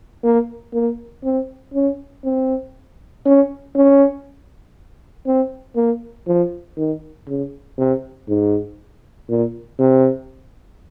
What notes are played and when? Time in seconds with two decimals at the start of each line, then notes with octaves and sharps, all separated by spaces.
0.24 A#3
0.74 A#3
1.24 C4
1.74 C#4
2.25 C4
3.26 C#4
3.75 C#4
5.26 C4
5.76 A#3
6.27 F3
6.77 D#3
7.28 C#3
7.78 C3
8.28 G#2
9.29 A#2
9.79 C3